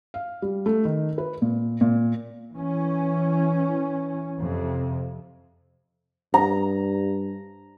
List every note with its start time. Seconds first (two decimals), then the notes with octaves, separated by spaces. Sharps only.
0.14 F5
0.42 G3
0.66 A3
0.85 D#3
1.18 B4
1.42 A#2
1.81 A#2
2.53 E3 C#4
4.38 F2 C3
6.34 G2 A#5